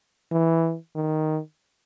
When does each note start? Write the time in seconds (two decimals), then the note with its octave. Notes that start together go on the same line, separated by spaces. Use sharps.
0.31 E3
0.95 D#3